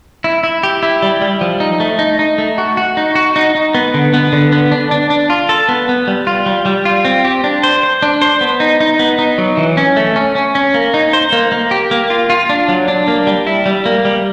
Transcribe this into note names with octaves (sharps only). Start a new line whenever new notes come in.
E4
E4
G4
E4
G3
G3
F3
D#4
A3
D#4
D#4
A3
F#4
F#4
D#4
F#4
D#4
D#4
B3
D3
B3
D3
B3
D4
D4
D4
F4
A4
B3
B3
G3
F4
G3
G3
F4
C4
G4
D4
C5
C5
D4
C5
B3
D#4
D#4
B3
D#4
F#3
E3
C#4
A3
C#4
C#4
C#4
A#3
D#4
C5
A#3
A#3
G4
A#3
F4
F4
D4
F#3
D4
A#3
G3
E4
G3
A#3
G3